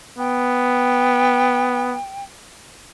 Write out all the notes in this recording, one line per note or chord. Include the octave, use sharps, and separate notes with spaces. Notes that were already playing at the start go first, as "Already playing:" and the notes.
B3 G5